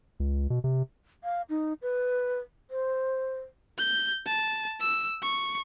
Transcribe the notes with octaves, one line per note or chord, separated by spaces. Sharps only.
C#2
B2
C3
F5
D#4
B4
C5
G6
A5
E6
C#6